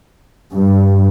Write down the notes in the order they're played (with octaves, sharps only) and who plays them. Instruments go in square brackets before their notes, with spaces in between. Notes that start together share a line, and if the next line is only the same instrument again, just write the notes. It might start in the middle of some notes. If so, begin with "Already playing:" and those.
[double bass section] G2